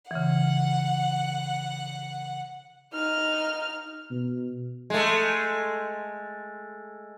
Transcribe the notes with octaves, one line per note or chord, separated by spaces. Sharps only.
C#3 E3 F#5
D#4 F6
B2
G#3 A3